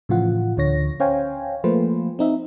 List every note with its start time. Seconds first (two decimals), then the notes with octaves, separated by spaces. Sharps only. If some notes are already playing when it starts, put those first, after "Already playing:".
0.09 A2 C#3 E3 F3 F4 F#5
0.57 D2 D3 C#5 A#6
1.00 C#4 C5 C#5 F5 G5 G#5
1.64 F3 A3 A#3 F4 B4 C5
2.19 C4 D#4 E5